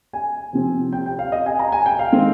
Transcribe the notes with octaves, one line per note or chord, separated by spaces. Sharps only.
G#5
C3 F3 C4
G5
G5
F5
D#5
G#5
A#5
G#5
G5
F5
D#3 G#3 C4